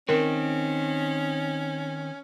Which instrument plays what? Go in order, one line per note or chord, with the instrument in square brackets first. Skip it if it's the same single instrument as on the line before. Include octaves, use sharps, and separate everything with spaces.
[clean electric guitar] D#3 C4 [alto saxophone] C#4 [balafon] A#4